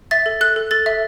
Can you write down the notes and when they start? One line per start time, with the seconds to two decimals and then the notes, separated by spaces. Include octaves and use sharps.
0.11 E5 A6
0.26 A4
0.41 A4 F#6
0.56 A4
0.71 A4 A6
0.86 E5